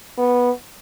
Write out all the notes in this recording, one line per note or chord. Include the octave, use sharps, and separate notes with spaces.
B3